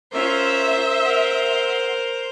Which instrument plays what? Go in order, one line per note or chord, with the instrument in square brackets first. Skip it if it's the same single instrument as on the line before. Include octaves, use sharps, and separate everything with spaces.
[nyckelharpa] C#4 F4 [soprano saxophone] A#4 [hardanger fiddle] C5 [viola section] E5
[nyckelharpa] A#4 [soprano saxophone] F#5